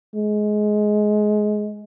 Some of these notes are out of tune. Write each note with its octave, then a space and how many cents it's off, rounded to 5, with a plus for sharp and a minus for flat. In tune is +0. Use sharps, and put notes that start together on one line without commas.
G#3 +20